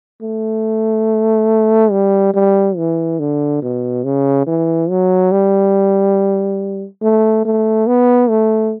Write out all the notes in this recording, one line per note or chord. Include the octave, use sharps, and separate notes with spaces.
A3
G3
G3
E3
D3
B2
C#3
E3
F#3
G3
A3
A3
B3
A3